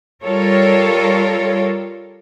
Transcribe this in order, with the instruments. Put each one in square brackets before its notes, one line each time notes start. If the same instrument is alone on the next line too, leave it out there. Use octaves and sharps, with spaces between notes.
[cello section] G3 F4 A4 A#4 C#5